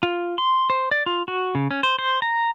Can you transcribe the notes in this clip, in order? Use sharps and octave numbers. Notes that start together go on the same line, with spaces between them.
F4
C6
C5
D5
F4
F#4
C#3
C#4
C5
C5
A#5